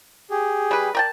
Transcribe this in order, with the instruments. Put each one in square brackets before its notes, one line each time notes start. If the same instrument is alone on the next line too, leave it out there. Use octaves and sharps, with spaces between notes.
[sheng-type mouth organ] G4 G#4
[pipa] G3 B4
[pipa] A#4 G5 A5 [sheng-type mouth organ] D5